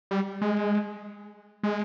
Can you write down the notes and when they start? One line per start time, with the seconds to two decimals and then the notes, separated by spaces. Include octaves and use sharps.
0.11 G3
0.41 G#3
1.63 G#3